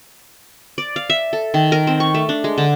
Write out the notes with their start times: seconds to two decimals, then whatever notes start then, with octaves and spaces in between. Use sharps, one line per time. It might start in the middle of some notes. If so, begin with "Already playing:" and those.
0.78 D5
0.96 F5
1.10 E5
1.33 A4
1.54 D#3
1.72 A#4
1.87 C4
2.00 C#6
2.14 A3
2.29 D4
2.44 G#3
2.58 D3